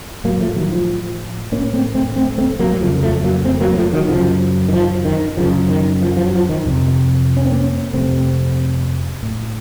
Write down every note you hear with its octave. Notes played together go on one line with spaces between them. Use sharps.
A2 F#3 A#3
F3 A3
D#3 F#3
F3
A2 A#3 C#4
A3 C4
A3 C4
A3 C4
A3 C4
F#3 A#3
F#3
F2 C#3 F3 A3
F3 A3
F#3 A#3
A3 C4
F#3 A#3
A#3
F3 A3
D#3 F#3
F#2 C#3 F3
D#3
F3
D#3
F#2 C#3 F3
D#3
F3
F3
F#3
F3
D#3
F2 C3
C#4
C4
A#3 C#4
F2 C3 A3 C4
A2